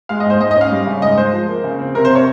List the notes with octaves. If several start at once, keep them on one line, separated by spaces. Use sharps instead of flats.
G#3 F5
D#5
G#2 C5
G#2 D#5
D#5
C#4 F5
G3
C#3
G#2 D#5
G#3 C5
F3
A#3
C#3
C4
C3 A#4
C5
C3
C#5